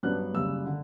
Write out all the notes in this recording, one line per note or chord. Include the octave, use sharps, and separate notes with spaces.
G2 F#3 B3 D4 F#6
F#1 F#2 C#3 G3 E6
D3